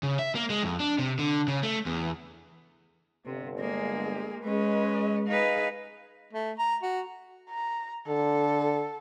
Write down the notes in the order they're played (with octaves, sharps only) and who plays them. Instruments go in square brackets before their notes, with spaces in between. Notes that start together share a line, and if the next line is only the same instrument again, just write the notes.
[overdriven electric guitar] C#3
E5
A#3
G#3
F2
D4
C3
D3
C#3
A3
E2
[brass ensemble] G1 [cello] C3
[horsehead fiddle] G#3 G#4 [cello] A#3
[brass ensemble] G#3 [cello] C#4 [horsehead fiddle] B4 D#5
[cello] D#4 B4 [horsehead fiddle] G#4 F5
[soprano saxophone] A3
A#5
F#4
[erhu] A#5
[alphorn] D3 [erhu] A4